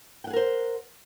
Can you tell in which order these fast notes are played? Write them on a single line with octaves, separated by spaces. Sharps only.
G5 F#5 G#4 A#4 C5